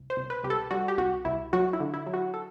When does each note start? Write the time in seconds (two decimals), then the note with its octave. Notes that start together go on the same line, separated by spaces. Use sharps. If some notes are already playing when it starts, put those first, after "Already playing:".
Already playing: C2
0.10 C5
0.17 C2
0.30 B4
0.43 C2 G4
0.50 A4
0.71 G3 F#4
0.88 G4
0.98 C2 F#4
1.25 C2 E4
1.53 F#3 F#4
1.73 E4
1.80 D3
1.94 E4
2.06 F#3
2.14 F#4
2.34 A4